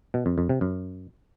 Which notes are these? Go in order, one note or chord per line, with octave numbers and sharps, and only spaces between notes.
B2
F2
F2
C3
F#2